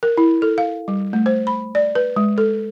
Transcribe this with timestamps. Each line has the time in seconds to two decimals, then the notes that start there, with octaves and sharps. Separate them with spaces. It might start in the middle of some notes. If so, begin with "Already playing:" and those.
0.03 A#4
0.17 E4
0.42 A4
0.58 F5
0.88 G3
1.13 A3
1.26 C5
1.47 B5
1.75 D5
1.95 B4
2.16 G#3
2.38 A4